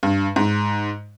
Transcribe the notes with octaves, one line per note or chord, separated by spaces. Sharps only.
G2
G#2